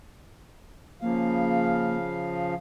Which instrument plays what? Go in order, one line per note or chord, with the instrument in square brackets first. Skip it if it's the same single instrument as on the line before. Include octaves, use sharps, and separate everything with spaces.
[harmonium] C#3 F3 F5 [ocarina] A#3